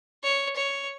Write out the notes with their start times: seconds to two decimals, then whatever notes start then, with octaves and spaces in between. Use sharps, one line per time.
0.23 C#5
0.56 C#5